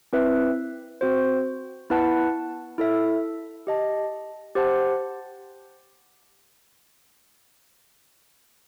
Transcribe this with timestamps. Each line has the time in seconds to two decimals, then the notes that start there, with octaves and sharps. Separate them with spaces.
0.13 C4 E4 B4 E5
1.01 C4 F#4 C5
1.90 B3 E4 B4 F#5 A5
2.78 E4 A4 E5
3.67 G4 D#5 A5
4.55 G4 C5 F#5 A5